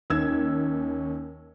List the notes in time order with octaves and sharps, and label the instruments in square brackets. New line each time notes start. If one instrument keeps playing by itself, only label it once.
[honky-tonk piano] D#2 E6 G#6 [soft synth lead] C#4